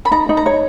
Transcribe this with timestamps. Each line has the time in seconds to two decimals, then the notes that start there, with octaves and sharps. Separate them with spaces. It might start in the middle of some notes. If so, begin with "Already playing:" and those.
0.05 B5
0.11 D#4 A#5
0.29 D#4
0.37 A#5
0.46 C#5